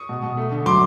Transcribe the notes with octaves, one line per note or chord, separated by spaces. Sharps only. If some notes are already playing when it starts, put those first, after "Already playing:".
Already playing: C#6 D#6
B2
B2
A3
D3
F#3 C6 D6